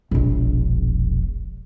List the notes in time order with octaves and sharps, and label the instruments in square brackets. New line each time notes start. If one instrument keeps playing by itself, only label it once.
[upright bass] E1 A#1